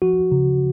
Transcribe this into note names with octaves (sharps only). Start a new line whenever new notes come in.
F3 F#4
C#3